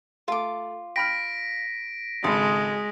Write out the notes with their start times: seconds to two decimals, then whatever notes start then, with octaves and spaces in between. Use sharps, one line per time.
0.28 A3 F4 D6
0.96 G5 B5 F6 A#6 B6 D7
2.24 G#1 C#2 G#3 A4 B5 C6 D#6